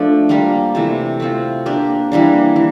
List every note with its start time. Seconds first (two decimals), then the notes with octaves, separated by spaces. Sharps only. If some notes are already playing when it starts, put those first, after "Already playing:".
Already playing: F3 A3 D4
0.29 G3 A#3 F4 A#4
0.75 C3 E3 A3
1.20 A3 C4 F4
1.66 A#3 D4 G4 A#4
2.12 E3 G3 A#3 D4
2.56 E3